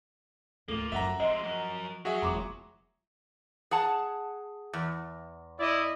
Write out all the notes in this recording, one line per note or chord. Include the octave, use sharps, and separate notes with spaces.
D2 G#2 A#3 F4 A4
F#2 F#3 E5 F#5 A#5
F3 G#3 C4 D#5
F#3 A#4
F#3 F#4 G#4 E5
E1 A#5 C6 D6
G#4 F#5 A5
E2
E4 D5 D#5